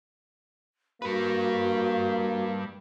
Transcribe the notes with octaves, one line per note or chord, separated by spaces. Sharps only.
G3 A#3 F#4 B4